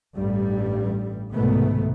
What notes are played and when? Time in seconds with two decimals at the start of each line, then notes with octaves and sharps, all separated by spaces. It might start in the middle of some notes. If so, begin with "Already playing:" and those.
0.15 A1 G2 G3
1.33 C2 G#2 B2 D#3 A3 B3